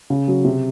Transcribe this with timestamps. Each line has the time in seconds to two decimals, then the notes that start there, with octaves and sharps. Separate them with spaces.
0.10 C#3
0.28 F#3
0.45 C3